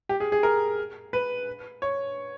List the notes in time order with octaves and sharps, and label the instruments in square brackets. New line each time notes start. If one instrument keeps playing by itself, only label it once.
[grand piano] G4
G#4
G#4
A#4
B4
C#5